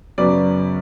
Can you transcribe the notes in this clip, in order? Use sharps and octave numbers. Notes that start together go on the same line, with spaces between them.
F#2 C#3 F#3 B3 D5